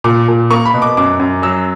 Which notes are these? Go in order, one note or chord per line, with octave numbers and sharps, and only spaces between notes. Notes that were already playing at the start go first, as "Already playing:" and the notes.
A#2 D6
A#2
A#3 C#6
B5
B2
D6
F#2 D6
F#2
F#3 E6